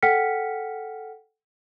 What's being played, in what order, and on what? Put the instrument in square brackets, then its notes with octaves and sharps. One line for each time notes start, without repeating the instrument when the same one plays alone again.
[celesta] A4 F#5 G5 F6 B6 C#7